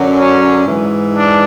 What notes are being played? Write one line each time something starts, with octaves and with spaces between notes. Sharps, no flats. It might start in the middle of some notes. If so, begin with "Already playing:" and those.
Already playing: F#2 D3 F#3
C#4
G#2 E3
D4